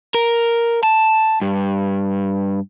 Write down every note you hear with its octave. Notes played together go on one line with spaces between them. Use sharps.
A#4
A5
G2